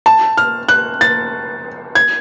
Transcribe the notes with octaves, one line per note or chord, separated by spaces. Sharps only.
A5
F6
F#6
A6
G#6